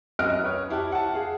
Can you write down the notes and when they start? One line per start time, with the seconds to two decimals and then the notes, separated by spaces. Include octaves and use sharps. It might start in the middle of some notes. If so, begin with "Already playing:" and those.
0.19 F#2 D#5 F6 D7
0.44 B4 C#5
0.70 E4 G4 A5
0.92 F#5 A5
1.14 G#4 F5